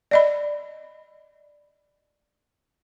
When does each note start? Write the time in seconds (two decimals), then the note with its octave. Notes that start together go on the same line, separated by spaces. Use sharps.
0.11 D5 D#5 B5